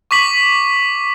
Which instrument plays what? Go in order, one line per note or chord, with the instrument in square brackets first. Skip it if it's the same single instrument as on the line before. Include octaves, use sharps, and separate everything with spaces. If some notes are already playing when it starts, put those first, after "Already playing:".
[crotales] C#6 D6 B6 F#7